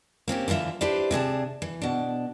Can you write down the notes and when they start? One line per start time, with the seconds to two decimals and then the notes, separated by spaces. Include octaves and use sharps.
0.28 A#3 C4 C#4 G4
0.48 D3 E3 G3 F4 E5
0.81 D4 E4 G4 B4 C5 D5
1.11 C3 D4 G#4 A5
1.62 E3
1.82 B2 D4